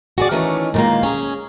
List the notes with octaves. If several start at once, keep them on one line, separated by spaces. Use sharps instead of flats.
F#4 G#4 D5
D#3 E3 A3 C#4 D#4
A#2 D#3 G3 G#3 A#3
C#4 G#4